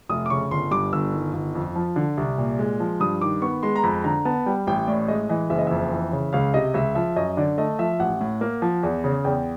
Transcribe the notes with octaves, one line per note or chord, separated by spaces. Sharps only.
F1 D#6
D6
C#3 C#6
G1 C6
G2 D6
G1 E6
D#3
G1
F2
F3
D3
C2
A#2
G#3
F3
G2 D#6
D#3 D6
B3 C#6
G#3 C6
A#5
F2 B5
D3 A#5
B3 A5
G3 G5
A1 G5
A2 D5
G#3 D#5
E3 D#5
F#1 E5
D#5
F2 E5
E3
C#3
C#2 F5
C3 D#5
C#2 E5
F3 E5
F#2 D#5
D3 D5
A3 D#5
F3 E5
A1 F#5
A2
A#3
F3
E2
C#3
E2 G5